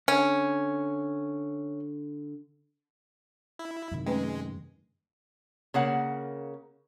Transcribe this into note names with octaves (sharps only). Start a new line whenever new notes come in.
D3 C#4
E4
F#2 C3 D#3
G#3 A3 C#4 B4
C#3 A#3 F#5